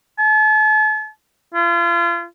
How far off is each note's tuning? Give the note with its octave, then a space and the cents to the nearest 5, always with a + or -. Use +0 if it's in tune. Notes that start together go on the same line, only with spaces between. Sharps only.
A5 -40
F4 -35